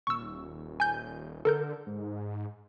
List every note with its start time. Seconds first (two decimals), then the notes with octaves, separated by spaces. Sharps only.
0.07 D#1 C#6 E6
0.80 G#5 G6
1.45 D3 A4 A#4 G6
1.86 G#2